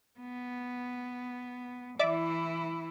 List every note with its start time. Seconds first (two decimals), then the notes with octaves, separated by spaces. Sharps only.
0.20 B3
1.99 E3 E4 D5 E5 D6